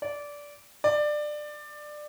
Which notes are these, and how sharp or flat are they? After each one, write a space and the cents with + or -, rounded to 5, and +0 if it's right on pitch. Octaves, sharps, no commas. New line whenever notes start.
D5 -15
D5 +20